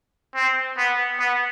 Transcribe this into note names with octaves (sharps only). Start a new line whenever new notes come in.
C4
B3
B3